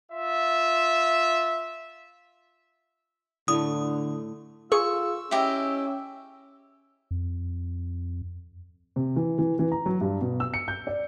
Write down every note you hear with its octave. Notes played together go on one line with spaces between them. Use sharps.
F4 E5
A2 D3 A3 D#6
F4 G#4 C#6 E6
C#4 E4 G4 D#5
F2
C3
E3
E3
E3
A#5
F#3
G2
B2
E6
C#7
G6
D5